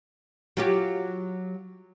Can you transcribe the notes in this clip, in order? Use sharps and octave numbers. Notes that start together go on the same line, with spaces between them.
F#3 F4 G4